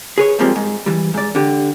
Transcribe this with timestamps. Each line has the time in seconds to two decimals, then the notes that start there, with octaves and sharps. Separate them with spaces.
0.18 G#4 B4 C#5
0.39 F2 G#2 F3 G3 A#3 C4
0.56 G#2
0.86 E3 G3
1.14 G#2 D5
1.35 D3 G4